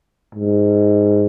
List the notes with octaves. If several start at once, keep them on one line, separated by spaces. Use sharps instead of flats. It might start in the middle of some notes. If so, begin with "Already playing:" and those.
G#2